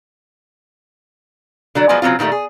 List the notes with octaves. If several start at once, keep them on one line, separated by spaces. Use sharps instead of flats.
D3 F#3 D4
F3 F#3 G#3 B3 D5
C#3 F#3 A#3 C4 F4
A#2 D#3 F3 G3 A3
G#4